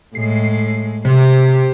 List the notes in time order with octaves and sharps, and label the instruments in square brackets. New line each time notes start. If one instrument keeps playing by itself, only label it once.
[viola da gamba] A2 G#3 [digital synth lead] C7
[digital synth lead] C3 [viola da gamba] G4 C5